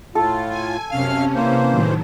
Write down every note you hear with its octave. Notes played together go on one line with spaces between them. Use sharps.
A2 F4 A4
G#5
F#2 C3 C#4 F5 F6
E3 A#3 C5
A2 D#3 F#3